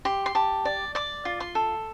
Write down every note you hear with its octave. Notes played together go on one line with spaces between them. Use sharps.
G4 C6
C6
G4 A5
D5
D5 D6
F4
C6
A4